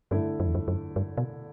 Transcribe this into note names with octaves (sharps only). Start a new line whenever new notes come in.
G2 D3 A3 E4
F#2
E2
F#2
F#2
G2
B2